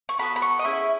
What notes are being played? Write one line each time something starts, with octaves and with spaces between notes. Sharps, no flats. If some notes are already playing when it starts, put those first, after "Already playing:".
C#6
B3 F#4 A4 B5
B5
C#6
D#5
C#4 E4 G#4 E5